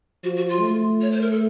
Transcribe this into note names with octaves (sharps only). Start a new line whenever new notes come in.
F3 F#4
F#4
F4
A3
C#5
C5
A#4
A4